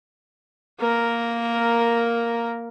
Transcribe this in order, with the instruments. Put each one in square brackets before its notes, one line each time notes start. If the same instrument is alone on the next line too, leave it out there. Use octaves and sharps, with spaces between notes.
[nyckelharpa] A#3 A#4